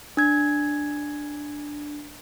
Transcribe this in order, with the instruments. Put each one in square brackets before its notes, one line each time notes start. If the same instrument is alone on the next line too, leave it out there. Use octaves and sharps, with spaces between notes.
[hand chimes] D4 G#6